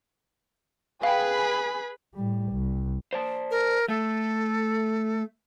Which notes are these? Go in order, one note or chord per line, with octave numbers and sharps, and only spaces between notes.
G#4 B4 F5 G5 B5
A2 G3
C2
C5 D5 A5
A#4
A3 A4